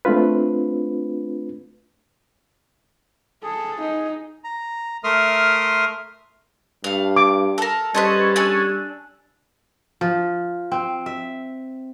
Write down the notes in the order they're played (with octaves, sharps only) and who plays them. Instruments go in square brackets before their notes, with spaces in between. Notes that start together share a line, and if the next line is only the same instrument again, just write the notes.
[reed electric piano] A3 C4 D4 F4 B4
[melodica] G#4 [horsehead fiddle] A4
[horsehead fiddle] D#4
[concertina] A#5
A3 A#4 E5 C6 D#6 F6
[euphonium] G2 [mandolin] A3 F5
[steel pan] D6
[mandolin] A4 A#4
[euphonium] G3 [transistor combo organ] C#4 G#4 A4 [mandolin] B4 C5 D#5
[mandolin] D4 G#5 E6
[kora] F3
C4
E5